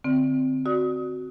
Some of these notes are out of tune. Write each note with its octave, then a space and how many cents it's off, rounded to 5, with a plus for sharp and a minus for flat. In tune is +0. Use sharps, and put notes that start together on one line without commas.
D3 +0 C4 -10
F#4 +0 D5 +0 D#6 +30